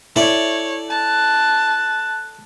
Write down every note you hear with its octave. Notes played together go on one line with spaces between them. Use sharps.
E4 A4 C#5 D5
A5 F#6